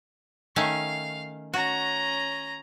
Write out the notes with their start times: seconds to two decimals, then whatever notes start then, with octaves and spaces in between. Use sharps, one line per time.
0.56 D#3 A3 C#4 F5
1.54 C#4 F#4 A#5